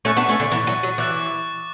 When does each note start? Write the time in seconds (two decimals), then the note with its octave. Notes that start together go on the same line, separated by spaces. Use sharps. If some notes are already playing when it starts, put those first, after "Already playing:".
0.05 A3 C#4 C#6 F#6 A6
0.16 B3 D4
0.29 A3 C#4
0.40 D3
0.52 E3
0.67 F#3
0.83 F#3
0.98 E3 D6 F#6 A6